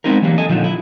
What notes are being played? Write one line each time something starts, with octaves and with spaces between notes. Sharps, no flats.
G#3 B3 C4 D#4 E4 A#4
E3 F#3 G3 A#3
A4 D#5 G#5
A#2 D3 D#3 F3 F#3
E4